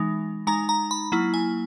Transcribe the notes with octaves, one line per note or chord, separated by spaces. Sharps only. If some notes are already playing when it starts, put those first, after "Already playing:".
Already playing: E3 G#3 D#4
G#3 D#4 A#5
A#5
B5
F#3 A#3 E4
G#5